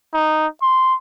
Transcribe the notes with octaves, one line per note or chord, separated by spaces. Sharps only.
D#4
C6